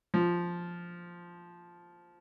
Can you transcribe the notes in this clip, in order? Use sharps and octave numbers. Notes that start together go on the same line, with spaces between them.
F3